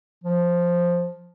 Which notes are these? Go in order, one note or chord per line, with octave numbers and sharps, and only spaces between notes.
F3